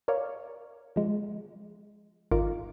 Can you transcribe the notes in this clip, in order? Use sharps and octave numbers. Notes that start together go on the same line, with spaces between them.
A#4 C#5 D5 F5
F3 G#3
G#1 D#4 F4 A#4 D6